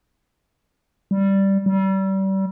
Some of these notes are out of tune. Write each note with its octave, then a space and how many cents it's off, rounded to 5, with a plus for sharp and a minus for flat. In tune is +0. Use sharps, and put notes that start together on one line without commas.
G3 -5
G3 -30